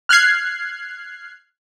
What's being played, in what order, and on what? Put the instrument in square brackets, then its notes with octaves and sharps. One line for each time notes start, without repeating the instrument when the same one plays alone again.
[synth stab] F6 F#6 G#6 C7